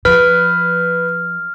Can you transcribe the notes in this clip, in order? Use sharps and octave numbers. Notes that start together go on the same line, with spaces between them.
F3 B4 F6